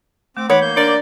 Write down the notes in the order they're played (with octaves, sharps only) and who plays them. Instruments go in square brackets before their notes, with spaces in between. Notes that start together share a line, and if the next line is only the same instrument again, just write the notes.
[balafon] A3 [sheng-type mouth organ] C4 D6
[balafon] E3 D#4 B4 [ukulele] C#5 [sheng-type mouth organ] F#5 B5 D6
[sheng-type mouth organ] A#3 G6
[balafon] D4 D6 [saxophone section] A#4 D5